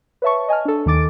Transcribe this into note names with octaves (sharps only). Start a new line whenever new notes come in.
B4 C#5 E5 A5 C#6
D#5 G#5 A5 F6
D4 A4
D#2 D#3 A4 D6 A6 D7